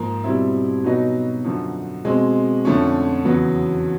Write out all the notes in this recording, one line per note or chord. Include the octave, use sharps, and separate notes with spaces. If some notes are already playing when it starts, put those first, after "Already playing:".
Already playing: G#2 F3 A#3
B2 G3 C4 E4
B2 F#3 B3 D#4
F#2 D3 F3
B2 G#3 C4
F2 D3 F3 A3 C#4
E2 C#3 F#3 B3